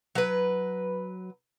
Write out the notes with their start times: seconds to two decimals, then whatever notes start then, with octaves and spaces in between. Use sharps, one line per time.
0.15 F#3 B4